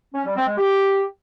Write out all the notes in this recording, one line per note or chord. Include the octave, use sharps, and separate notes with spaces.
C#4
G3
C4
G#3
G4